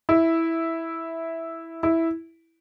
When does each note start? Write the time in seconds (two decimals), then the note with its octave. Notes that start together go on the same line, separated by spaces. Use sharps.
0.09 E4
1.83 E4